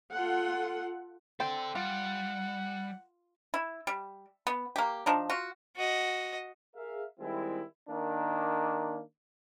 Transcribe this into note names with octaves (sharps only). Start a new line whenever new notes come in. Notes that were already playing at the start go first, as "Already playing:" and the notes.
F4 A4 F#5
C4 A4 D5 G5
G3 F4 F#5
E4
G3
B3
A#3 G4
F3 D4 D#4
F4 F#4
F#4 D#5
G#4 A#4 E5 F5
D#3 G3 G#3 C4 E4
D#3 A#3 D4